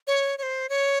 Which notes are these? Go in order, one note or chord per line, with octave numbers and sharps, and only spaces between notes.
C#5
C#5
C5
C#5